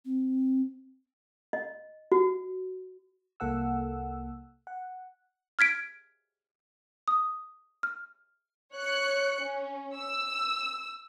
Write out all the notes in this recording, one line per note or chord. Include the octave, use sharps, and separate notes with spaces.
C4
D#5
F#4
C2 A#3 A4 F#5 E6
F#5
F6 G#6 B6 D7
D#6
F6
C#5 F#6 C#7
C#4
E6